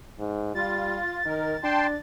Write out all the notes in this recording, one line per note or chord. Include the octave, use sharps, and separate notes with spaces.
G#2
G3 F4 A6
D#3 A#4
D4 G5 A5 C6